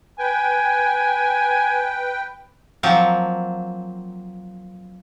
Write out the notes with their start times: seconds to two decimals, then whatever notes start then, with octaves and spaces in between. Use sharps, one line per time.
0.19 B4 G5 G#5
2.83 F3 F#3 A#3 C4